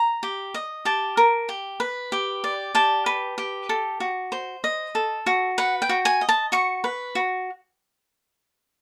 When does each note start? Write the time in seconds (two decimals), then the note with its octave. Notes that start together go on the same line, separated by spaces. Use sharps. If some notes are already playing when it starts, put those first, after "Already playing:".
Already playing: A#5
0.23 G4
0.54 D#5
0.85 G4 A5
1.17 A#4
1.49 G4
1.80 B4
2.12 G4
2.44 D5
2.75 G4 A5
3.06 B4
3.38 G4
3.69 A4
4.00 F#4
4.32 C5
4.64 D#5
4.95 A4
5.26 F#4
5.58 B4 F#5
5.82 G5
5.89 F#4
6.05 G#5
6.21 D#5
6.29 A5
6.52 F#4 C#6
6.84 B4
7.15 F#4